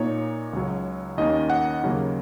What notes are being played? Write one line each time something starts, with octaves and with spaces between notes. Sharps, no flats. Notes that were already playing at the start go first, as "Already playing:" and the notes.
Already playing: A#2 A#3 D#4 C#5
C#2 C#3 F#3
D#2 D#3 A#3 C#4 D#5
F#5
D#2 C#3 F#3 A#3